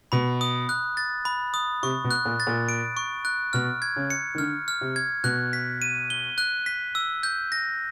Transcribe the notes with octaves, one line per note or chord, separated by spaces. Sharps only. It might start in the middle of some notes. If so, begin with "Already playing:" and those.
B2 B5
D#6
F#6
A6
B5
D#6
C3 C#6
B2
F#6
A#2
A6
A#2
D7
C#6
F#6
B2 F6
G#6
C#3
C#7
D#3
D3 F6
F6
C3
G#6
B2 F#6
B6
D#7
G7
F#6
B6
E6
G6
A#6